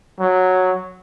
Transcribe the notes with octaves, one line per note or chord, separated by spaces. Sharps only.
F#3